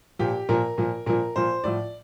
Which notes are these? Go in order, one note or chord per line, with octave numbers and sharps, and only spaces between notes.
A#2 F3 G4
A#2 F3 A#4
A#2 F3
A#2 F3 A#4
A#2 F3 C5
A2 F3 D5